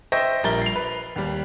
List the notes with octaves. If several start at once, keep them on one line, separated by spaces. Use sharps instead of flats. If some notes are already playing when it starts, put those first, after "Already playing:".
C5 D#5 E5 G5 C#6 A#6
A#1 G3 A#4 A6 G7
C7 F7
B4
D#2 G3